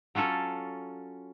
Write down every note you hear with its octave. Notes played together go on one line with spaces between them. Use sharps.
F#3 C#4 F4 A4 C#5